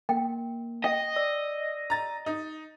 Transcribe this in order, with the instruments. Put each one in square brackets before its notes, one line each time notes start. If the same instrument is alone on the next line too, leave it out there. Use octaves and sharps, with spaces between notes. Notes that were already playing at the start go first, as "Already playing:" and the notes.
[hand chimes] A#3 [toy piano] G5
[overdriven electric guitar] D#5 [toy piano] G5
[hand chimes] D5 E6
[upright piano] A#5 A6
D#4